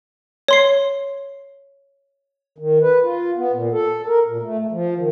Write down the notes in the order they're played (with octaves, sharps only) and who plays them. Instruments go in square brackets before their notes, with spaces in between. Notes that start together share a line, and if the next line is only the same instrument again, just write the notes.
[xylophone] C#5 C6 C7
[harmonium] D#3
B4
F4
B3
A#2
A4
A#4
A#2
A3
A3
F3
D#3